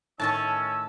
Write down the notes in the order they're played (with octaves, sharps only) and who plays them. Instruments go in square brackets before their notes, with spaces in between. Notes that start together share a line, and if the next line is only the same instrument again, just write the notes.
[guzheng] A2 D#3 D#5 [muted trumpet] C#4 [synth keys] A5 [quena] E6